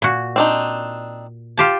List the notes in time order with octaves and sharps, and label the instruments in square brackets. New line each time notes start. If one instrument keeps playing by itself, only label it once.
[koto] A#2 F#4
[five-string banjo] C4 D4 D#4
[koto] F4 G4 A5